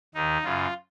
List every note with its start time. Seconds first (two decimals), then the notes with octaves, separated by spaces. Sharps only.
0.15 D#2 D#3 D#4
0.43 F#2 C#3 F4